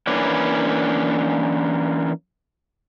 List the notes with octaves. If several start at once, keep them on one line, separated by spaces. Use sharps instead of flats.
E3 A#3 C#4 D4 B4